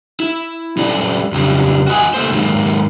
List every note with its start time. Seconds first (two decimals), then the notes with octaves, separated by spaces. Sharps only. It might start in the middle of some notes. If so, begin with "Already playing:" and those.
0.20 E4
0.77 F#3 G3 C#4 A4 D5
1.32 F2 C#3 F#3 G3 D4
1.87 F#4 D#5 G#5
2.14 A3 A#3 C5
2.32 G#2 D#3 F#3 G#3 A#3